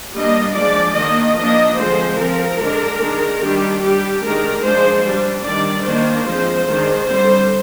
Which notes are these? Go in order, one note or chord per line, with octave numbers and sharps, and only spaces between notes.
G3 A#3 D4 D#5
F3 G#3 D4 D5
D#3 A#3 D4 D#5
F3 A#3 D4 D#5
D3 F3 G#3 C4 C5
F3 C4 A#4
D3 G#3 D4
D#3 G#3 D4
D#3 G3 D4 G4
G3 D4 G4
D#3 G#3 D4 A#4
F3 G#3 D4 C5
G3 D4
D#3 G3 D4 D5
D#3 A#3 D4 C5
F3 G#3 C4
D#3 G#3 D4
D3 G3 C4 C5